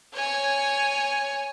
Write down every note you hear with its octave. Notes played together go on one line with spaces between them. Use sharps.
C#5 G#5